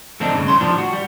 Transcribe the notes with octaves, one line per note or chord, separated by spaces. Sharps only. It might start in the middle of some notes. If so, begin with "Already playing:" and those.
F2 D3 A3 C4 D4 D#4
G2 C#3
E2 C#5 C6
A2 D#3 F3 D4 G4
F#4
G3